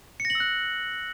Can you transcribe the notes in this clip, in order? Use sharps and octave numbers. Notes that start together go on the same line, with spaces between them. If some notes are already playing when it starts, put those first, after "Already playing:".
C#7
A#6
F#7
E6
F#6